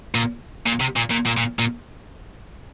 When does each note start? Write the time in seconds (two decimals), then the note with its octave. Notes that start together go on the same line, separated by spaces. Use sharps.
0.15 A#2
0.67 A#2
0.81 C3
0.97 A#2
1.11 A#2
1.26 A#2
1.37 A#2
1.59 A#2